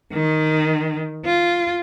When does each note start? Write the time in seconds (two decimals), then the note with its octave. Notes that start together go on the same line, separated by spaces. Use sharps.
0.12 D#3
1.26 F4